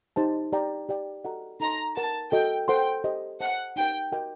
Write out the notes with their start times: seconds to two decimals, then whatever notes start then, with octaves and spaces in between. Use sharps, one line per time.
0.16 D#4 G4 C5 D#5 A5
0.52 G4 D5 G5 A#5
0.89 G4 D5 G5
1.24 F#4 A4 D#5 F#5 A#5
1.60 D#4 A4 D#5 A5 A#5 C6
1.96 A#4 F#5 A5 A#5
2.32 F#4 A4 D#5 G5
2.68 A4 C5 F#5 G5 C6
3.04 G4 C5 D#5
3.40 C5 D#5 F#5 A5
3.76 D#4 G4 A#4 G5
4.12 F#4 A#4 D#5 G5